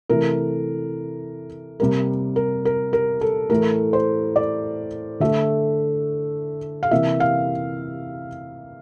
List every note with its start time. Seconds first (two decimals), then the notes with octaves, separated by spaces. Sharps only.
0.09 C3 E3 A3 A#4
1.80 C3 G3 A#3 A#4
2.36 A#4
2.65 A#4
2.93 A#4
3.21 A4
3.50 A2 E3 A3 A#4
3.93 C5
4.36 D5
5.20 D3 A3 E5
6.83 F5
6.91 C3 E3 A#3 E5
7.20 F5